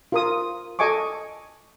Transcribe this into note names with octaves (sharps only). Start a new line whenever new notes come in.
F4 A#4 D#6
A4 D#5 G#5 C#6 D6